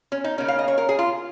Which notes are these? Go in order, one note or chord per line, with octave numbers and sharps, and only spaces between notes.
C#4
D#4
C#3 A#3 C#4
F5
D#5
C#5
A#4
G#4
F4